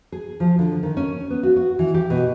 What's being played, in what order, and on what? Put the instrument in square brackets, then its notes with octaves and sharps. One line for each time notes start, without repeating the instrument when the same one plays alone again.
[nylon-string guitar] G#4
F3
D3
D#3
C#4
B3
F#4
F#4
E3
G4
B2